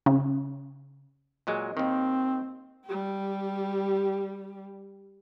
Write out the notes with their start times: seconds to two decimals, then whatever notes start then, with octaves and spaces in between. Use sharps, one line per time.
0.06 C#3
1.47 A#2 F#3 G#3
1.77 D#2 D#3 C4
2.85 G3 G4